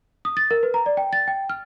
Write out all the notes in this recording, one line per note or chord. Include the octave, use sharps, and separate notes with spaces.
D#6
A6
A#4
B4
A#5
D5
G5
A6
G5
F6